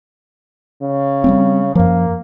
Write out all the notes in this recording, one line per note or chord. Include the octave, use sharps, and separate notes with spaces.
C#3
G3 G#3 C4
F#2 F3 A#3